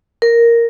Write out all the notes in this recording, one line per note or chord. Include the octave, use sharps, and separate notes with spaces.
A#4